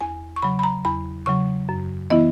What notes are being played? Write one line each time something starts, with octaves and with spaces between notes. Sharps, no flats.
E2 G#5
C#6
C#3 F#3 B5
B5
A#5
E2 B5
C#3 F#3 C#6
F#2
E3 B3 E4 D#5